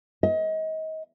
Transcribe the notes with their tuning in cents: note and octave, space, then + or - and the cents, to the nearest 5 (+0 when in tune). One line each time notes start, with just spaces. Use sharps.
D#5 +30